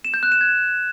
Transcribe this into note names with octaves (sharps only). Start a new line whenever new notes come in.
E7
G6
F#6
E7
G#6